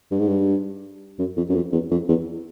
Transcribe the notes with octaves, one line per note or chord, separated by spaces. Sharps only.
G2
G#2
G2
F#2
F2
F#2
F2
E2
F2
E2